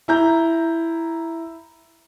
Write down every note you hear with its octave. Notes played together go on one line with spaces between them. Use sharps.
E4 A#5 G6